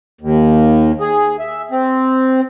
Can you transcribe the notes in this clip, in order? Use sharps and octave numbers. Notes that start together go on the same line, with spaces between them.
D#2
G#4
E5
C4